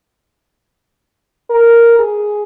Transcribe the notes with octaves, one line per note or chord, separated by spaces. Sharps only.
A#4
G#4